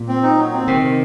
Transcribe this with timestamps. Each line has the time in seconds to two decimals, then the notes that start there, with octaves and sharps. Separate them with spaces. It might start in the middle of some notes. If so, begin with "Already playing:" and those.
Already playing: A#2
0.08 C4
0.23 D#4
0.38 F#3
0.54 C4
0.67 C3 D#3
0.83 D#3